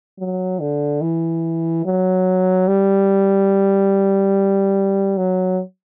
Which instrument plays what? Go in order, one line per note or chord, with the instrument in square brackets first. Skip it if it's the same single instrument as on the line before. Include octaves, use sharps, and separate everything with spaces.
[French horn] F#3
D3
E3
F#3
G3
F#3